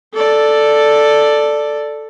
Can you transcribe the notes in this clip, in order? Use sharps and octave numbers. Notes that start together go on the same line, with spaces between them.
A4 D5